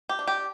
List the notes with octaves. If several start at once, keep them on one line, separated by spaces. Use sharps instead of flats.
G4
D4
G4